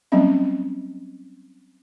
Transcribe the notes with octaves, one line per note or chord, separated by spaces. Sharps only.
F#3 G3 A#3 C4 C#4 E5